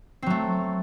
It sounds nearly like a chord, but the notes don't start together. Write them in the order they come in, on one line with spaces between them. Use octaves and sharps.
C4 F#3 A3